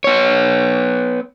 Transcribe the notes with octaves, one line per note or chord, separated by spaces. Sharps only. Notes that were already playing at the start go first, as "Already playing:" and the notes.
B3 C#5